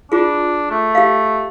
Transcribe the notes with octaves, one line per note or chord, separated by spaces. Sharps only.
D4 F4 G#4
A3
G4 F5